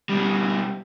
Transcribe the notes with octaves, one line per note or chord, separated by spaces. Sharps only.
B2 G3